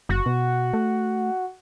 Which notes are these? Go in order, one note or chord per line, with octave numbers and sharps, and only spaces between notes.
F#1 F#4
B2
A3